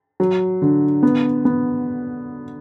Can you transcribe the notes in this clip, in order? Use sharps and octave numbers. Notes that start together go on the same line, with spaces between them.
F#3
D3
B3
B3